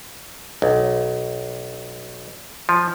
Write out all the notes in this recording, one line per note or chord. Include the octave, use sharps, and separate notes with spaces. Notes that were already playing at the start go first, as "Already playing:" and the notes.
B1
F3